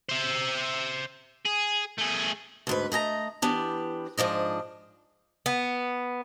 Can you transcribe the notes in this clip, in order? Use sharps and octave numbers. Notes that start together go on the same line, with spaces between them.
C5 E5
G#4
A3 G#4
D2 G#2 B4
A3 D#5 G#5 A#5
E3 B3 D4 G4
G#2 F3 D4 D#5
B3